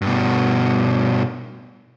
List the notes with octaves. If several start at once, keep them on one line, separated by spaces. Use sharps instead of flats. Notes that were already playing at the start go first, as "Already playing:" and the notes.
G2 B2